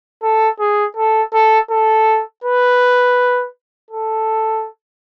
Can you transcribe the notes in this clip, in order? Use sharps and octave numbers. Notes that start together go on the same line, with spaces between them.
A4
G#4
A4
A4
A4
B4
A4